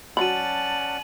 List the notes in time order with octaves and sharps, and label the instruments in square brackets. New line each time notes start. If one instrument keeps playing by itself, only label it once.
[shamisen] F#3 B5 [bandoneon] C#4 D5 F#5 [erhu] A5 [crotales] D#7 F#7